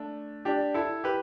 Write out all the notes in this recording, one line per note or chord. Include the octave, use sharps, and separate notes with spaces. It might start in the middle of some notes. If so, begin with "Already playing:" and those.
Already playing: A3 D4
D4 G4
E4 A4
G4 B4